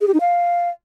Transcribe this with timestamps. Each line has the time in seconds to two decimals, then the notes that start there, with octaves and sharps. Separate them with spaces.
0.01 G#4
0.07 G4
0.14 D#4
0.20 F5